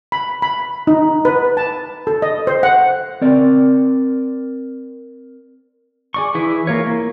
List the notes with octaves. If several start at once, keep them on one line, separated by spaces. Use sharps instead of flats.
B5
B5
D#4
B4
A5
A4
D#5
C5
F#5
C4 A#4 D5
G#4 D5 C#6
E3 E4 G#4 E5
A#3 F4 C#5
A#3